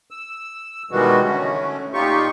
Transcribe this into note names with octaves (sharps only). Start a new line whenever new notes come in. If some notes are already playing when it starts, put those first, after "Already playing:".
E6
B2 D#3 E3 G3 G#3 F#4
D3 A3 C#4
A#2 D#4 F4 G4 C#6